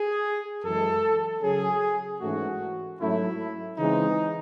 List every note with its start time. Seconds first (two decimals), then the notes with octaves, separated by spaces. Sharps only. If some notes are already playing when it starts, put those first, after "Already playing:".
Already playing: G#4
0.64 F#2 E3 G#3 A4
1.42 C#3 F#3 C#4 G#4
2.21 G#2 E3 A3 C#4 F#4
3.00 G#2 F#3 A3 C#4 E4
3.78 C#3 E3 G#3 C4 D#4